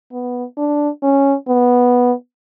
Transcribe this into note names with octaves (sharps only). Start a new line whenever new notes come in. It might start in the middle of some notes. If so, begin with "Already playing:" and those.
B3
D4
C#4
B3